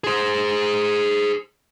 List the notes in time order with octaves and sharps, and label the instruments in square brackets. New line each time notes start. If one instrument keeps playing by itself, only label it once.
[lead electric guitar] G#4 C5